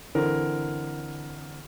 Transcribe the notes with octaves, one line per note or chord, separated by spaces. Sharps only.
D3 E3 C4 A#4